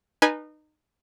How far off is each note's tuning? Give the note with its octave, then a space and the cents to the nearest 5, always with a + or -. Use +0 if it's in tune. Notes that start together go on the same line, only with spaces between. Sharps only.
D#4 -25 B4 -25 G#5 +0